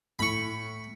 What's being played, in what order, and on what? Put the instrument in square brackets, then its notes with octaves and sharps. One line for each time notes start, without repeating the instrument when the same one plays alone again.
[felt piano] A2 [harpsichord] B5 C#6